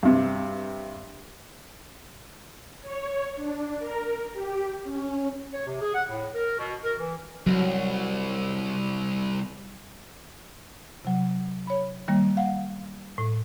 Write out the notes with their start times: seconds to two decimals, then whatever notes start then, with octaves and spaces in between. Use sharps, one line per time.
0.03 G2 C3
2.81 C#5
3.36 D4
3.79 A#4
4.33 G4
4.83 C#4
5.53 C#5
5.67 C3
5.81 G#4
5.95 F#5
6.08 A2
6.35 A#4
6.59 B2
6.84 A#4
6.98 E3
7.47 C2 F#3
11.05 C3 F#3
11.67 C#5 B5
12.08 D#3 G3 A#3
12.37 F5 F#5
13.18 A2